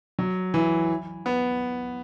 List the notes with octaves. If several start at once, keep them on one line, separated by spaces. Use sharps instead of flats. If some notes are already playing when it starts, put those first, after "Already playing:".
F#3
E3
B3